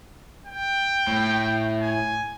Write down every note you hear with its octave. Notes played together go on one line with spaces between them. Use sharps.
G5
A2
G#5